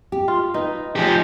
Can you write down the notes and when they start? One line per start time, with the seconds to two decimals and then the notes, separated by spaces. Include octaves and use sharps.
0.12 G4
0.28 F4
0.54 D#4 B4
0.96 F3 D#4 G4 G#4